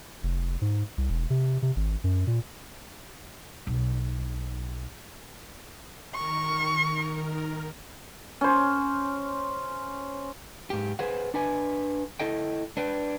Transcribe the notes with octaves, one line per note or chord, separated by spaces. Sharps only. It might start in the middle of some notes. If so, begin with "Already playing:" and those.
F1
G#2
C2
E1
C3
C3
G#1
F#2
A#2
B1
D#3 A#4 C#6
C#4 C5
G#2 G4
G#4 B4 C5 F#5
D4 B4 G#5
E4 A4 D#5 G5
D4 B4 G5